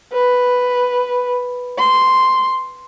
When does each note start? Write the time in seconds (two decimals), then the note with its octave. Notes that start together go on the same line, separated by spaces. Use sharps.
0.13 B4
1.78 C6